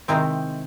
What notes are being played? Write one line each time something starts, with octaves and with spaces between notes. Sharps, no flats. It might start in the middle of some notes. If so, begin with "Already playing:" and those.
C3 D#3 G#3 C4 E4